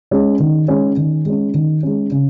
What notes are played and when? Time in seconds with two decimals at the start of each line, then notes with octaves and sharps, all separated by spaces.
0.11 G#3 C#4
0.40 D#3
0.68 G#3 C#4
0.97 D#3
1.25 G#3 C#4
1.54 D#3
1.83 G#3 C#4
2.11 C#3